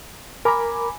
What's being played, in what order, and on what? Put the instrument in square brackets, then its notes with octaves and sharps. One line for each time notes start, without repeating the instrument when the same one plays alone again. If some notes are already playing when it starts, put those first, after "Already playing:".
[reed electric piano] A#4 A#5 [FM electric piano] G#5 B5 D6